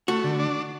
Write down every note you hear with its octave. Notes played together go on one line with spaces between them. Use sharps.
A3 F#4
D3
D4